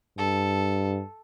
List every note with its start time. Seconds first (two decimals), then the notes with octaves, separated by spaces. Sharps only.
0.18 G2 A4